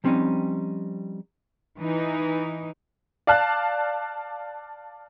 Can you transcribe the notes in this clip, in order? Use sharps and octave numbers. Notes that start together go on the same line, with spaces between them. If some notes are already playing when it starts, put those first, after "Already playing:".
F3 G3 C4 C#4 D#4
E3 D#4
D5 F5 A5 F#6